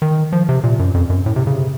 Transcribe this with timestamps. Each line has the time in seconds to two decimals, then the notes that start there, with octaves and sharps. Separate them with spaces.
0.02 D#3
0.32 F3
0.49 C3
0.63 A#2
0.79 F#2
0.94 F2
1.10 F#2
1.26 A2
1.36 C3
1.47 C#3
1.57 C3